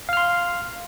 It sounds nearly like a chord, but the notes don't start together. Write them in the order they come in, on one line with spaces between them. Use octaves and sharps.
F5 F6 C6